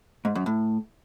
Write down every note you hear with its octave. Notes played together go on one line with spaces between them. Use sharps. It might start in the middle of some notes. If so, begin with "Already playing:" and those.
G#2
F#2
A2